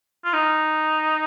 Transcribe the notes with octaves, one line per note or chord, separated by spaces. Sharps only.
F4
D#4